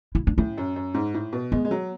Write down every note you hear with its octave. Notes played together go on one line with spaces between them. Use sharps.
E4
D4
A2 C#4
F#2
F#2
G#2
A2
B2
G#3 B3
G#3
F#3